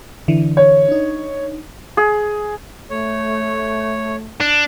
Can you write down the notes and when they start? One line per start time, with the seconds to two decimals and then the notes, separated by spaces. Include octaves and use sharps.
0.28 D3 E3
0.57 C#5
0.89 D4 D#4
1.97 G#4
2.90 A3 C#5
4.41 D4